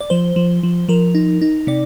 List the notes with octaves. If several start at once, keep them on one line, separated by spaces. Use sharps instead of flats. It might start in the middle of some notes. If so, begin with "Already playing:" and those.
D5
F3 C5
F3
F3
F3 A#4
D#4
D#4
C3 D5